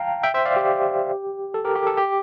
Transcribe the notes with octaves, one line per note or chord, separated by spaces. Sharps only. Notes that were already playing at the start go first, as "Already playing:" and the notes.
Already playing: F5 G5 A5 A#5
E5 G5
C5 E5
D5 F5
G4
A4
G4 A#4
G4
A4
G4